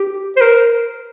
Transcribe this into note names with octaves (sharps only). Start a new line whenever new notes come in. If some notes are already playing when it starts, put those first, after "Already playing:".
Already playing: G4
C5
A#4